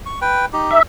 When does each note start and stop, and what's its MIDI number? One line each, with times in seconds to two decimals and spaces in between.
0.06 0.19 85
0.22 0.45 71
0.22 0.45 79
0.53 0.79 63
0.53 0.79 67
0.71 0.82 76